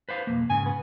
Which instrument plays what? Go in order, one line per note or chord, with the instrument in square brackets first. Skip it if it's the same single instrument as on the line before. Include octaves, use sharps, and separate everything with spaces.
[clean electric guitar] B4 C5 F5
B1 F2 A#3
[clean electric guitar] G#2 C#3 [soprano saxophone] G#5
[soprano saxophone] B3